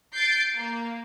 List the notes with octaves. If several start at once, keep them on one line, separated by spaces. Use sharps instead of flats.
G6 A6 C7 D7
A#3